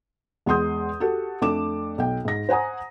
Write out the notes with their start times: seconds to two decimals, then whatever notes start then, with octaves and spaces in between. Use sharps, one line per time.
0.46 E2 G#3 F#5 C6 D#6 G6
1.00 F#4 G4 A4
1.41 F2 A3 D4 D6 E7
1.98 B1 G5
2.25 G#2 A#6
2.49 C5 F#5 G#5 A#5 D#6